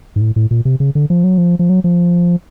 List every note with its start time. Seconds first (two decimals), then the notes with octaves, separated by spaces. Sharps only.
0.16 G#2
0.21 A2
0.36 A2
0.51 A#2
0.65 C3
0.80 C#3
0.95 D3
1.10 F3
1.24 F#3
1.38 F3
1.59 F3
1.69 F#3
1.84 F3